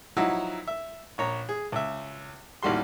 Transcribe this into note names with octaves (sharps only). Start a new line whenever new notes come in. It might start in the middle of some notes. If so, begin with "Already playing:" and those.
F3 F#3 D#4 E4 F#4
E5
A#1 C#5 A#5
G#4
C#2 E5
A1 D#2 G3 F#4 C6